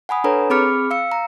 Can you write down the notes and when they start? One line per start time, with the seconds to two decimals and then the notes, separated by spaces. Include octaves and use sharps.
0.09 F#5 G#5 B5 D#6
0.24 D4 A4 B4 C#5 A#5
0.50 C4 G#4 B5 D6 F6 C#7
0.91 F5 E6 C#7
1.12 A#5